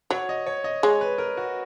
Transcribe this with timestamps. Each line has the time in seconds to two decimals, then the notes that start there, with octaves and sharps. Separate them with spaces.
0.10 F#3 C#5
0.29 D#5
0.47 C#5
0.64 D#5
0.83 G#3 C#5
1.01 B4
1.18 A#4
1.37 F#4